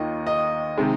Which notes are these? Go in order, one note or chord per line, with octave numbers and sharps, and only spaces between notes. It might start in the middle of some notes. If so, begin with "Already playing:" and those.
Already playing: D#2 D#3 A#3 F4 D#5
D#5
C3 D#3 G#3